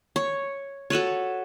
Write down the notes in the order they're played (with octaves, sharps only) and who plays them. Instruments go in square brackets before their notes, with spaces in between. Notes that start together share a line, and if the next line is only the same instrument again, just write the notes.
[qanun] C#5
F#4 A4 B4 C#5